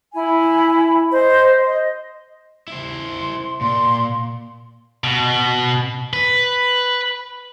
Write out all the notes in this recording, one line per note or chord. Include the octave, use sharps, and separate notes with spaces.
E4 G#5
C5 D#5
D#5
E4 C5
C6
A#2 C6
B2
B4